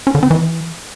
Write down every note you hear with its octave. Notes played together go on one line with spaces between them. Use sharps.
C#4
D3
C4
E3